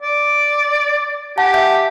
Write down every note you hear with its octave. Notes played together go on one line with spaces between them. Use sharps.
D5
G4 F#5 G#5 A5
E5 G6